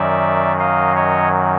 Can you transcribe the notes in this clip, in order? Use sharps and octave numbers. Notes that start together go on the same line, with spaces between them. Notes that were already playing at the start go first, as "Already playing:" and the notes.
Already playing: F#2 D#3 F#3 D5 E5
D#5 F5
C#5 D#5